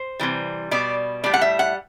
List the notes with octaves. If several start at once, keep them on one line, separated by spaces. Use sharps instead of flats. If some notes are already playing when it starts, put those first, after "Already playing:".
Already playing: C5
C3 E3 G3
B2 G3 D5
A2 G3 D5
F#5
E5
F#5